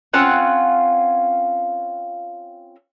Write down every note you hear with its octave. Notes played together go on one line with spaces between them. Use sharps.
C4 C#4 F4 F#5